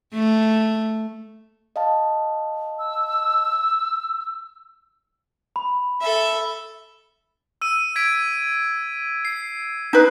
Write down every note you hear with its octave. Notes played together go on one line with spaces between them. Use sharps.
A3
D#5 F5 A5
E6
B5
A4 E5
E6 D#7
G#6 B6 D7
C7
D#4 B4